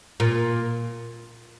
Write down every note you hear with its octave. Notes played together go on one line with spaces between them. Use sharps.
A#2